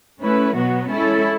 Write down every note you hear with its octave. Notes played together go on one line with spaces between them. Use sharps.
A3 C#4 E4 B4
B2 F#3 B3 F#4
G#3 C#4 E4 A4